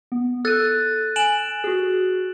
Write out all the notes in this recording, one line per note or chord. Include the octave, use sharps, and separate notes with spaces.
B3
A4 E6 F#6 A6 D#7
G#5 D7 E7 F#7
F#4 G#4